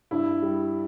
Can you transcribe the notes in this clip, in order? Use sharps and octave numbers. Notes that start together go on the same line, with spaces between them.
G2 E4
G3